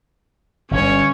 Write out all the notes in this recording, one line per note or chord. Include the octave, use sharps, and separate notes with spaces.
G1 C#4 C#5